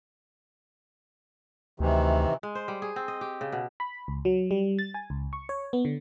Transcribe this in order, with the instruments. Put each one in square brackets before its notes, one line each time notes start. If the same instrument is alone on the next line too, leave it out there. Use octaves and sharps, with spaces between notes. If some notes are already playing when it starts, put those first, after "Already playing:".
[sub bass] D2 [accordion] C3 D#3 E3
[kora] G#3
C5
G3
G#4
C4
D#5
G4
C#3
B2
[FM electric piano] B5
C#2
F#3
G3
A6
G#5
C#2
C#6
C#5
B3
D3